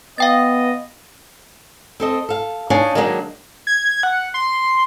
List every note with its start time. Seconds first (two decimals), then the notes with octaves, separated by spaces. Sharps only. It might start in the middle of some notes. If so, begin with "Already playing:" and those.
0.18 B3 D#5 F5 G5 A6
2.00 C4 A4 D#5
2.29 A4 F5
2.70 D4 D#4 C#5 F5 G#5
2.95 D#3 F#3 G#3 A#3 C#4 D4
3.67 G#6
4.03 F#5
4.34 C6